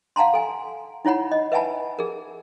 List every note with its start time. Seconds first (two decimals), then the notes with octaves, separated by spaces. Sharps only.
0.16 F5 F#5 A5 A#5 C6
0.34 A4 G#5
1.05 D#4 E4 C#5 F#5 B5
1.32 D#5
1.52 B4 E5 F#5 G#5 A5 B5
1.99 G#4 A#4